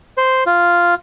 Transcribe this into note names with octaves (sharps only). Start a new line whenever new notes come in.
C5
F4